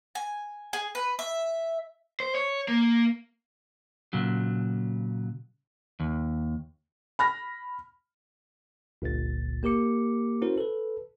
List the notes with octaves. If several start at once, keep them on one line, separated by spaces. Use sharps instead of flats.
G#5
G#4
B4
E5
C5
C#5
A#3
A#2 C#3 F#3
D#2
B5 F6 A#6
G1 C#2 A#2 A6
A#3 G4 A#4 D6 C#7
C#4 E4 F#4 A#4 C5
A4 B4